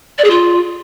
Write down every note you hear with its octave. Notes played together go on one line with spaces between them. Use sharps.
D5
G#4
F4